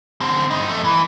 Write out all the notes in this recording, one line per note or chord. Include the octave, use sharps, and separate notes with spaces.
D3 C4
G2 D#4
F2 A3
E3